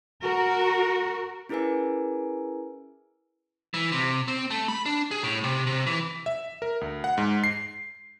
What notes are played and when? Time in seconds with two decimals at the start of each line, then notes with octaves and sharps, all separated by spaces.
0.21 F#4 A#4
1.49 C#4 E4 G#4 A#4 B4 G#5
3.74 E3
3.92 C3
4.28 C4
4.50 A3
4.68 B5
4.86 D4
5.11 G#4
5.23 A2
5.44 C3
5.66 C3
5.86 E3
6.26 E5
6.62 A#4
6.81 D2
7.04 F#5
7.18 G#2
7.44 C7